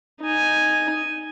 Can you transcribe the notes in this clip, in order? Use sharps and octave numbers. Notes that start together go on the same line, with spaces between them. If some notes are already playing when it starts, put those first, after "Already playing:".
D#4 G#5